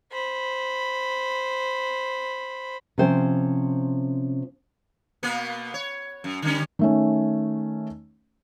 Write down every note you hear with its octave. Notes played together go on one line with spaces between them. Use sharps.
C5 B5
C3 F3 C#4 C5 G5
B2 A#3 B3
C#5
F#2
D3 G3 C#4
D#3 A3 C#4